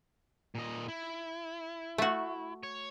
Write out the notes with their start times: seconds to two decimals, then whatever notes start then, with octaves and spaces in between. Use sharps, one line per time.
0.55 A#2 D#5
0.88 E4
1.98 A3 F#4
2.63 C#5